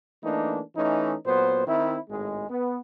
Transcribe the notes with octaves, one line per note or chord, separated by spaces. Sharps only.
E3 A3 A#3 D4 D#4
E3 A3 C#4 D#4
A#2 F#3 B3 C5
D#3 C4 E4
G#1 A2 G#3
B3